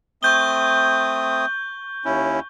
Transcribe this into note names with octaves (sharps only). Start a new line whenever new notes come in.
A3 C4 C#6 D#6 G6 G7
D#2 C#4 E4